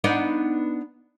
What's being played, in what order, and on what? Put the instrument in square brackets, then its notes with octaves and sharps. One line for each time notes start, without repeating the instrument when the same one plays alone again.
[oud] B3 D4 D#4